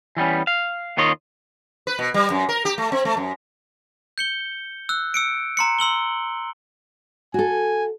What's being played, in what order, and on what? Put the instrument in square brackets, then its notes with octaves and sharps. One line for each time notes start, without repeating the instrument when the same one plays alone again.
[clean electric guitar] E3 G3 B3 C#4
F5
D#2 D#3 F4 C#5 D#5
[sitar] B4
B2
G3
F#2
A#4
G4
A3
C4
A3
F#2
[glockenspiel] G6 C#7 G7
E6 F#6
E6 C#7 D7
A#5 C6 C#7
C6 E6 F#7 G7
[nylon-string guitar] F#4 A4 [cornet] G#5